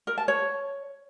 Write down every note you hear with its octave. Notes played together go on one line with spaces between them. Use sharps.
A#4
A5
C#5